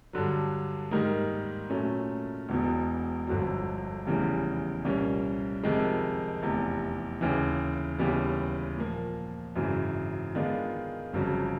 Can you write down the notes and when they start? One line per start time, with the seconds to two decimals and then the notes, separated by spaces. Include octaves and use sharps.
0.13 G2 D3 F#3
0.91 G#2 D#3 G3 A#3 D#4
1.70 A#2 F#3 A3 C#4
2.49 E1 E2 B2
3.27 G1 F2 D3 F#3
4.06 F1 E2 C#3 E3 G3
4.85 C2 A#2 G3 A#3 C#4
5.63 F2 C3 D#3 G#3
6.42 F1 E2 C3
7.21 D#2 C#3 E3
7.99 D#2 C#3 E3 G3 B3
8.78 A#2 F3 A#3
9.56 G#1 F#2 C#3 E3
10.35 D#3 G#3 B3 D4 F4
11.13 G1 F2 C#3 F#3